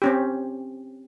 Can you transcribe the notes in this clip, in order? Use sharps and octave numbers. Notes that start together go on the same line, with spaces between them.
C4 C#4 G4